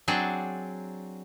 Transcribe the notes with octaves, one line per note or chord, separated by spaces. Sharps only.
F#3 C4 D4 G#4 D5